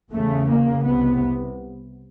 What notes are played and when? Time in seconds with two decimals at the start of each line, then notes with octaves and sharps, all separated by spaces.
0.12 E2 C#3 A3
0.49 A#3
0.85 C2 C3 B3